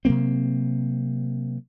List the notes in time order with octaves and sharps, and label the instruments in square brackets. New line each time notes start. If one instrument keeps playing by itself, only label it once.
[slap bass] C3 F#3 A#3 C4